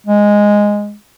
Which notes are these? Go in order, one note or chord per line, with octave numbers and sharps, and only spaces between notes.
G#3